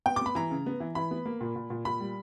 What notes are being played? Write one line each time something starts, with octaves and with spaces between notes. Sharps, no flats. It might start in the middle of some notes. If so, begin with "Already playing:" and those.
B3 G5
D6
B3 B5
E3 A#5
C#3
B3
E3
E3 B5
B3
A#3
A#2
A#2
A#2
A#2 B5
G3